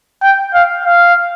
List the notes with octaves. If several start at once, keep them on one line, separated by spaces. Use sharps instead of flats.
G5
F5
F5